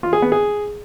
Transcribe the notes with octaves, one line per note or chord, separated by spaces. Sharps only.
F4
G#4
B3
G#4